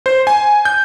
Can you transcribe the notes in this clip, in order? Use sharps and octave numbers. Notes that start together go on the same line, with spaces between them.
C5
G#5
G6